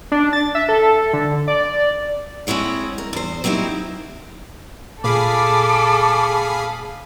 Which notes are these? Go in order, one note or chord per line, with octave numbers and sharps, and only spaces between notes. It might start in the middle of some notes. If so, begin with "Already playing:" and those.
D4
A6
E5
A4
D3
D5
G#3 C4 E4 C#5 F#5
A#4
E2 C5
F#3 C4 D#4 E4 G4
A#2 G#4 A4 F5 B5 D6